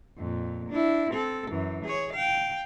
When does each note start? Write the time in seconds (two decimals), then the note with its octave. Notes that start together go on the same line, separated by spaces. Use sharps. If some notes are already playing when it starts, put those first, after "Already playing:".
0.18 F2 A#2
0.69 D4 E4
1.12 C4 A4
1.50 F#2 E3
1.85 G#4 C#5
2.13 F5 G5